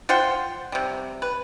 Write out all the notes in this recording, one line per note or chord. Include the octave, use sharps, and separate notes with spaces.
F4 C5 F#5 G5
C3 G3
B4